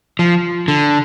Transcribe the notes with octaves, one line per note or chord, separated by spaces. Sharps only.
F3
D3